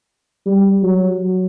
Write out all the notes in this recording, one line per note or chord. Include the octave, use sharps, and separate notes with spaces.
G3
F#3